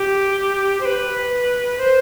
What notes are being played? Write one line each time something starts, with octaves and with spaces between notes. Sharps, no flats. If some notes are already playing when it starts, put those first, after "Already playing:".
Already playing: G4
C5
B4
C5